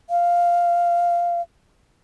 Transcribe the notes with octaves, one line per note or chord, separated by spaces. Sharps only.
F5